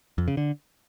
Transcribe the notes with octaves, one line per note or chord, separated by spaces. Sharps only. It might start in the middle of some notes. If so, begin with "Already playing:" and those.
F2
C#3
D3